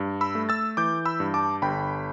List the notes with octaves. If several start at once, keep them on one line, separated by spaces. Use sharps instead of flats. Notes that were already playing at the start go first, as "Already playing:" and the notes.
Already playing: G2
B5 E6
A3
E6 A6
E3 D6 G6
B5 E6
G2
A5 D6
G1 G5 B5